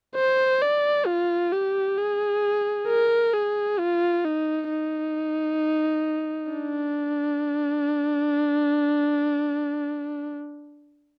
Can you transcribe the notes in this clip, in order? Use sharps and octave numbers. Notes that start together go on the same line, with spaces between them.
C5
D5
F4
G4
G#4
A#4
G#4
F4
D#4
D#4
D4